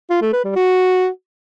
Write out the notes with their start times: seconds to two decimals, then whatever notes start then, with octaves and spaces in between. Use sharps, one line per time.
0.10 F4
0.21 A3
0.33 B4
0.44 G3
0.56 F#4